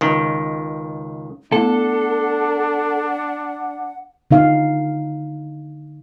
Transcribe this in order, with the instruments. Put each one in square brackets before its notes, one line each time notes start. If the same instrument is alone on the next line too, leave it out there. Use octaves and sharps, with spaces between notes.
[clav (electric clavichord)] C#2 D#3
[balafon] A3 B3 E4 [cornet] D4 [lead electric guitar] A4 [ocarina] F#5
[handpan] D3 D#4 F5